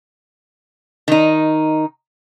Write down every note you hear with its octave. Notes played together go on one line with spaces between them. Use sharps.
D#3 D#4